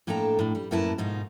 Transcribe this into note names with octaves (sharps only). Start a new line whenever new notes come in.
A2 A#3 D4 A4 G5 A#5
A2 D4
G3
F#2 A2 A#3 E4 B4 A5
G#2 B2 D#4 F4